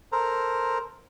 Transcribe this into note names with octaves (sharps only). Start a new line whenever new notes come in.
A4 A#4 C5 A#5